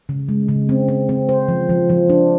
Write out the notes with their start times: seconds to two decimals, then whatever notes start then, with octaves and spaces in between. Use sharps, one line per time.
0.09 C#3
0.29 G#3
0.48 C#3
0.69 C4
0.89 C4
1.09 C4
1.29 C5
1.49 F3
1.69 F3
1.90 F3
2.10 D4